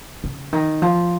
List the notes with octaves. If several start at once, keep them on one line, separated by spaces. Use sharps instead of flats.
C#3
D#3
F3